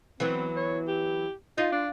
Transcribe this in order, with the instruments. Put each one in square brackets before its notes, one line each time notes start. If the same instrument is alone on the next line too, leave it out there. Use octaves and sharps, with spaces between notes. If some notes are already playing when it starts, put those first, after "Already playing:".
[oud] E3 F#3 B3 [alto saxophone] C4
[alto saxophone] C#5
G4
[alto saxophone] D#4 [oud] F4
[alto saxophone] D4